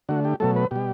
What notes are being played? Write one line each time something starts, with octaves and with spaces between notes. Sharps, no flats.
D3 A3 F#4
G4
B2 F#3 A3 A4
B4
B2 G3 G4